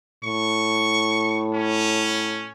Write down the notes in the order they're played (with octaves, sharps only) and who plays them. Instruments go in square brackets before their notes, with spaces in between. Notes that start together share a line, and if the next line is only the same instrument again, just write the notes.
[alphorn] A2 [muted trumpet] C#6
[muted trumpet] C#4